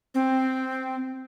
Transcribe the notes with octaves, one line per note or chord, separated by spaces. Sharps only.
C4